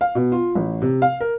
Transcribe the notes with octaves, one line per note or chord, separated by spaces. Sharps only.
F5
B2
F4
A1
C3
F5
A#4